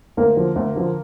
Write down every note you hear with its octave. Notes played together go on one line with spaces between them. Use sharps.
D2 A#3 A#4
D3 F3
D2
D3 F3